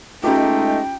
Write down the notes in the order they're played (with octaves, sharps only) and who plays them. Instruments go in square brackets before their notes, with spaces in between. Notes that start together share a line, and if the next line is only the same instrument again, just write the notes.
[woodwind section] G#3 D#4 [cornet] A3 [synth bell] C#4 F4 [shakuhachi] G5